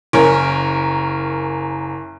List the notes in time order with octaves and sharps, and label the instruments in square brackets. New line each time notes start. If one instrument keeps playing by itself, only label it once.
[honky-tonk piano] F#1 C#4 A#4